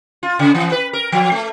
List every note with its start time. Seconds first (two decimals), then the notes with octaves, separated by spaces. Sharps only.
0.23 F4
0.39 C#3
0.55 E3
0.72 B4
0.93 A#4
1.12 F3
1.32 A3